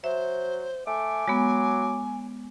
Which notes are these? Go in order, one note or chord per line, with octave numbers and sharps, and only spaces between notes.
F#3 C5 E5
A3 G#5 D6
F#3 G#3 B3